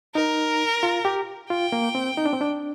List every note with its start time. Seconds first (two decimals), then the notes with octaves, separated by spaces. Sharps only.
0.15 D#4 A#4
0.83 F4
1.05 G4
1.50 F4 G5
1.72 A#3
1.95 C4
2.17 D#4
2.25 D4
2.33 C4
2.41 D4